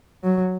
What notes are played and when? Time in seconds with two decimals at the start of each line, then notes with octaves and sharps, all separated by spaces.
0.23 F#3